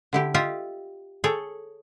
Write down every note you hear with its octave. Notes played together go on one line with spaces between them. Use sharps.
D3 E4 G4
F4 G4 D#5 E5
G#4 A4 C#5 G5